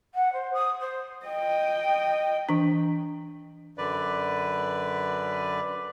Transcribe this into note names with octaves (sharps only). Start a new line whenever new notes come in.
F#5
C5
D#6
C5
D#5 G5
E3 D4
F#2 D3 B4 D5